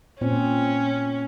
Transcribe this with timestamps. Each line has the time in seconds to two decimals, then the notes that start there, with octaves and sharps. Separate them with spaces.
0.21 A#2 C4 C#4